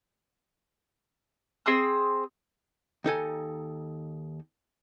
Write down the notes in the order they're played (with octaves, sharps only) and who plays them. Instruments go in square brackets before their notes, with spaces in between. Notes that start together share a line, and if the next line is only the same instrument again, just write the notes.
[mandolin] C4 G#4 D#6 E6
[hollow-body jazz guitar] D#2 D#4 A4 G#5